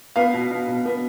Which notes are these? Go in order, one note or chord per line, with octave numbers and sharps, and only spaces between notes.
B3 F5
B2
B2
B2
B3